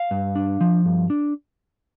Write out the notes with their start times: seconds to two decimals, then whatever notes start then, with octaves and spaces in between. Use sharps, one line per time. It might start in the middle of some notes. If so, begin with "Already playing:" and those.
Already playing: F5
0.11 G2
0.35 D4
0.61 F3
0.85 G2
1.10 D4